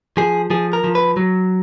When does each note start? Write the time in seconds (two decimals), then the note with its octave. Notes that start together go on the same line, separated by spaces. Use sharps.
0.17 F3 G#4
0.50 F3 G#4
0.73 A#4
0.84 F3
0.95 B4
1.17 F#3